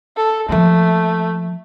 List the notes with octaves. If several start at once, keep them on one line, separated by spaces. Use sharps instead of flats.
A4
F3 A3 A#3